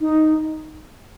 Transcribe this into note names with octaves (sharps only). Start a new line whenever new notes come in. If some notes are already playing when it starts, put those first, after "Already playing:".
D#4